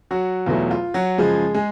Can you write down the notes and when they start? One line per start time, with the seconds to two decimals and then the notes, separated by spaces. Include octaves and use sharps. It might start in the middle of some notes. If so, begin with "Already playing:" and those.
0.11 F#3 F#4
0.46 E2 B2 F#3 A3 F4
0.71 F4
0.94 F#3 F#4
1.18 F#2 C#3 F3 G#3 G#4
1.54 G#3 G#4